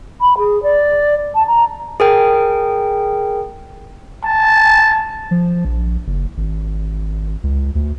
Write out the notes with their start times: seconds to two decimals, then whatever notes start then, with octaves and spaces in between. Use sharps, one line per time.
0.20 B5
0.38 G#4
0.63 D5
1.35 A5
1.47 A#5
2.00 G#4 A#4 G5
4.24 A5
5.31 F3
5.65 A#1
6.07 F#1
6.37 G#1
7.43 C#2
7.75 D2